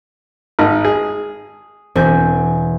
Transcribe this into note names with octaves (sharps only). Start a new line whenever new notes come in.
G#1 D#4
G#4
E1 C4 G#5 G6